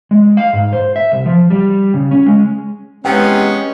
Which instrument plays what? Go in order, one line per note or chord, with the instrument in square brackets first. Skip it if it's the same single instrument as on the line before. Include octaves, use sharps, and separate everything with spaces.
[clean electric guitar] G#3
F5
G#2
C5
E5
C2
F3
G3
C#3
C#4
G#3
[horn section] C3 E3 B3 [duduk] G#3 [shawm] C#4 [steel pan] G5